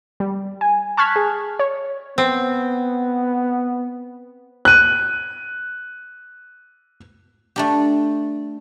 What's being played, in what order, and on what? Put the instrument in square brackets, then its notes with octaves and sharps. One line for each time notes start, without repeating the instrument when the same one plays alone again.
[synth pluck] G3
G#5
A5 C#6 F6 F#6 G#6 B6
G#4
C#5
[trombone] B3 [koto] C4
[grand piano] F#6 D#7
[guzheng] A3 D4 G4